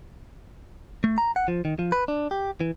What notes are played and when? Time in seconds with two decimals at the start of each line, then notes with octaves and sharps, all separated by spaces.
1.04 A3
1.18 A#5
1.36 F#5
1.48 F3
1.65 D#3
1.79 F3
1.92 B4
2.08 D4
2.31 G4
2.61 E3